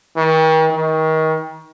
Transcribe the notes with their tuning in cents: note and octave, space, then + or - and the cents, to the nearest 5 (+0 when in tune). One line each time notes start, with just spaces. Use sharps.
D#3 +40
D#3 +30